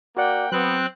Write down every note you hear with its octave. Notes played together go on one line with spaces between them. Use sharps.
A#3 F#4 D5 F#5 G5
F#3 B3 C4 F#6